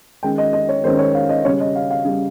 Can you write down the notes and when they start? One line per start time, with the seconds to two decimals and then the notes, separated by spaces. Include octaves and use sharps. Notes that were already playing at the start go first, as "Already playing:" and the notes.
0.23 D#3 G#3 C#4 G5
0.38 D#5
0.53 D#5
0.69 C#5
0.84 D#3 G#3 C#4 C5
0.99 C#5
1.15 F5
1.29 D#5
1.44 C#3 G3 C#4 C#5
1.60 D#5
1.76 F5
1.91 F5
2.05 C#3 G3 C#4